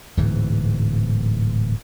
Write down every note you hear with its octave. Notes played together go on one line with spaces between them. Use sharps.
D1 G#2 E3